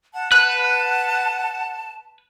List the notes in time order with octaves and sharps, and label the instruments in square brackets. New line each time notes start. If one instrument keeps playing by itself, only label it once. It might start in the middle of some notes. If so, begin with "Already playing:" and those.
[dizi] F#5 [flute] A5
[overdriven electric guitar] B4 [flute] A5 [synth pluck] F#6